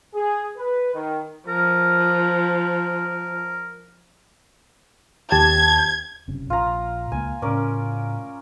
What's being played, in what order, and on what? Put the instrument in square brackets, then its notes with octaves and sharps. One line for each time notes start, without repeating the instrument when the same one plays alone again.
[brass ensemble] G#4
B4
D#3
[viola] F3 [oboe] A#4
[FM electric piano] D#2 G4 A5 [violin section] G#6
[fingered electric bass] F#1 C3 C#4
[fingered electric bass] A#1 [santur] F4 A#5
[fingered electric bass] C#2 A#3 [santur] G#5
[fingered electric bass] A2 C#3 [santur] C#4 A#4 D5